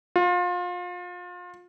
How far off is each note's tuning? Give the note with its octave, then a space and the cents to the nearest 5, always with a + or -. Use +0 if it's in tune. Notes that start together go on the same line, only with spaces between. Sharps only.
F4 +30